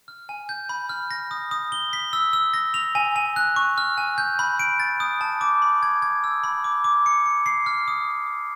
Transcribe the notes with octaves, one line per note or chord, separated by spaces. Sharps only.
F6
G#5
G6
B5
F6
A#6
D#6
D#6
G7
B6
E6
E6
A#6
F7
G#5
G#5
F#6
C#6
F6
G#5
G6
B5
D7
A6
D#6
A5
D6
B5
G#6
G#6
E6
B5
D6
D6
C#7
C#7
C7
F6
D#6